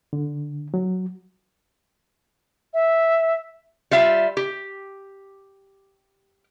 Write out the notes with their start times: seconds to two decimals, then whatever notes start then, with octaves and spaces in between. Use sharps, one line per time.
0.13 D3
0.74 F#3
2.74 E5
3.91 G3 F4 E5
4.37 G4